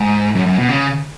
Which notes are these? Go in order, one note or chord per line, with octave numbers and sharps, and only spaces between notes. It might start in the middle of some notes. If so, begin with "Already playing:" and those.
Already playing: G#2
F#2
F#2
B2
C#3